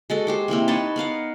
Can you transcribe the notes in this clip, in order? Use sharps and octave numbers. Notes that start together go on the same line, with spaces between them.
G#3 F#4 A4
G#3 G4 C5
C3 E3 A#3 C4
D#4 B4 C#5 A5
B3 A#4 F5 F#5